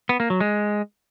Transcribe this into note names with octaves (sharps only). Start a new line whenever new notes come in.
B3
A#3
F#3
G#3